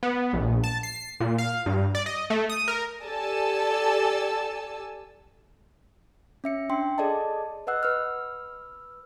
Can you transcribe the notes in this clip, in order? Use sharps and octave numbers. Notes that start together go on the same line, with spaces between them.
B3
A#1
A5
C7
A#2
F5
G2
D5
D#5
A3
D#6
A#4
G4 A4 D5 G#5 A5 E6
C#4 E5 C#7
D4 G5 C6
G#4 A4 D5 D#5 A5
B4 D#5 F#5 E6 F#6
B4 E6 F6